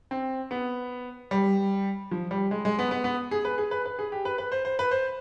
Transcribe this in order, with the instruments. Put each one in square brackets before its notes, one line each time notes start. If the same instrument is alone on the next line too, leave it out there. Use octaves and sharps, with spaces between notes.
[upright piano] C4
B3
G3
F3
G3
G#3
G#3
B3
B3
B3
G#4
B4
G#4
B4
B4
G#4
G4
B4
B4
C5
C5
B4
C5